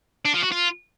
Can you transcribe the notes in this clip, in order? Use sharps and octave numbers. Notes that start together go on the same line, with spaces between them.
D4
F3
F#4
F4